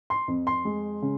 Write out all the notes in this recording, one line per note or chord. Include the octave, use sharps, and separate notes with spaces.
C6
F2
C6
G#3
C#3